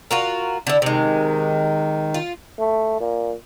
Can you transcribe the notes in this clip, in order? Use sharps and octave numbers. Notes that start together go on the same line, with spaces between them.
F4 F#4 A#4
D3 E4
C3 D#3 G#3
F4
A3
A#2